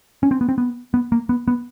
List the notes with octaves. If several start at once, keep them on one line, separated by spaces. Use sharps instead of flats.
C#4
C4
B3
C4
B3
B3
A#3
B3
B3